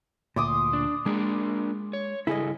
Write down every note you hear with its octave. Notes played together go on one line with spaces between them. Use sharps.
D2 A#2 C6 D6 D#6
D4
G#3 A#3 D4 A#4
C#5
G2 C#3 E4 G#4 A4 D#5